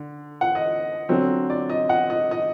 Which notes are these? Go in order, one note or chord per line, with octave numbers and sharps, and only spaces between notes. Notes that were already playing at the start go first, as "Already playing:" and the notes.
Already playing: D3
F#5
D#5
D3 F#3 C4
D5
D#5
F#5
D#5
D#5